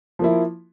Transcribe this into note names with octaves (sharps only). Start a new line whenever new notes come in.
F3 A#3 E4